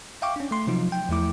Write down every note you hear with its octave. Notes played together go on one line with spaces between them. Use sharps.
E5 F5 G5 C#6 D6
C#4 D4
A3 C6
C3 F3 F#3 D#4 F4
G5
E2 F3 A3 E4 D6